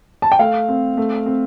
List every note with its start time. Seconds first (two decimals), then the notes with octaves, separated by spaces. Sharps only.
0.22 A5
0.32 G5
0.39 A3 F5
0.68 C4
0.97 A3
1.26 C4